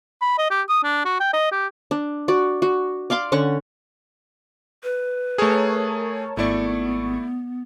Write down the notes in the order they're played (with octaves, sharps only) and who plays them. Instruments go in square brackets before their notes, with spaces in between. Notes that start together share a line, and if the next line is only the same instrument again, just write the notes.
[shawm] B5
D#5
G4
D#6
D4
F#4
G5
D#5
G4
[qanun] D4
F#4 D5
F#4
D5 F5 C6 D6
D3 C#4 F#5 C#6
[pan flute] B4
[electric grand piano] A3 G#4 [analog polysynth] A#4 C#5 A5
[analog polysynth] G#1 C#6 [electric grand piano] A3 E4 D5 [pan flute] B3